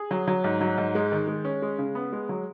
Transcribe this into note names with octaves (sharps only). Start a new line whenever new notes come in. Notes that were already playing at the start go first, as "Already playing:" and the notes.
Already playing: G#4
F#3
F#3
G#2
F#3
G#2
G#3
D#3
G#3
C#4
G#3
C#3
B3
G#3
F#3